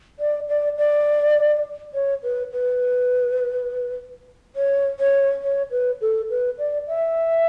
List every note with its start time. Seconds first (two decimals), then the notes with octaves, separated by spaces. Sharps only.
0.19 D5
0.49 D5
0.78 D5
1.94 C#5
2.23 B4
2.52 B4
4.56 C#5
4.99 C#5
5.42 C#5
5.71 B4
6.01 A4
6.30 B4
6.58 D5
6.88 E5